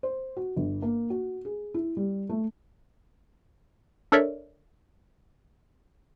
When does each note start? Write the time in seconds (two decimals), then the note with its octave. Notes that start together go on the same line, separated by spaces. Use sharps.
0.03 C5
0.37 F#4
0.57 G1
0.82 A#3
1.10 F#4
1.45 G#4
1.74 E4
1.97 G3
2.29 A3
4.12 D4 A4 A#4 C#5 D5 E5